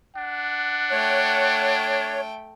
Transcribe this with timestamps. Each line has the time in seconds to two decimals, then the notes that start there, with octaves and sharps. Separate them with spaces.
0.17 D4 F#5
0.91 A3 C#5 G5